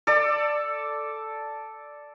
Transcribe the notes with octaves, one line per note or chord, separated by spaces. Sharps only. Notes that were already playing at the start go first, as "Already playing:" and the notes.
A4 D5